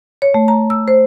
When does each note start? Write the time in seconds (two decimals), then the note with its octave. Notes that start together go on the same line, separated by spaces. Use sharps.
0.22 C#5
0.34 A3
0.48 A#5
0.70 E6
0.88 C5